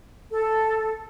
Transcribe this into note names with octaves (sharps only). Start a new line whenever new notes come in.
A4